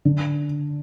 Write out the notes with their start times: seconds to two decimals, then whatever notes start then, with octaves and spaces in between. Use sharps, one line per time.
0.05 D3